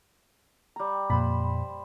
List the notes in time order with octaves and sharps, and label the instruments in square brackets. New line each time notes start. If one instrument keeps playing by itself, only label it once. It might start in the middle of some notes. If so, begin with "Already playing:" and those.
[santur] G3 A#5
[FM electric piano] F2 A#2 [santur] C5 B5